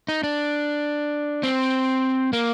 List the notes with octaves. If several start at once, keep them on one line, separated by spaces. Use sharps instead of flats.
D#4
D4
C4
A#3